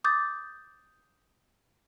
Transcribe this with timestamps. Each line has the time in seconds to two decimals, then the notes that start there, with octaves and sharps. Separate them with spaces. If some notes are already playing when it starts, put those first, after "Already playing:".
0.04 D6 D#6 G6 A6